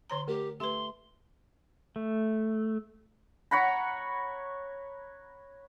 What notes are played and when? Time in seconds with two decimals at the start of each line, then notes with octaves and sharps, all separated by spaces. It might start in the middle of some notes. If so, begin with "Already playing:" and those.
0.10 D3 C#5 A#5 C6
0.28 A3 G4 A#4
0.60 A3 G4 B4 C6
1.96 A3
3.51 C#5 F#5 A#5 B5